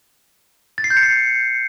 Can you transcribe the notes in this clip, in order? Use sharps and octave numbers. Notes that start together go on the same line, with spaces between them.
A6
C7
G6
C#7
C7